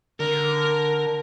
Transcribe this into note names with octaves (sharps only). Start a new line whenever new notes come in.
D3 A#4